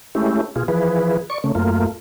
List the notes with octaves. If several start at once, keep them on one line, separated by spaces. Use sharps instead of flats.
G#3 A3 C#4 E4 G4
B2 F4 G#4
E3 F3 G#4 B4
D5 C#6
C#3 A3 C#4
F#2 A3 A#3 F4